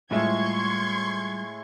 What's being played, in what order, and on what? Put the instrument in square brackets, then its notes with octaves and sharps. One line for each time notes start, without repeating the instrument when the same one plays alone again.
[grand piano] A2 G#3 E5 [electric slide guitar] G3 F4 [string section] C6 C#6 G#6